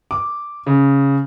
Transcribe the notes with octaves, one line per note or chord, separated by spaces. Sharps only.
D6
C#3